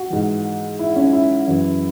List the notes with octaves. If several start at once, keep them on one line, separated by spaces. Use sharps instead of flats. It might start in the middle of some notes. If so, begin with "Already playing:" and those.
Already playing: F#4
G#2 E3
E4
C#4
E4
F#2 E3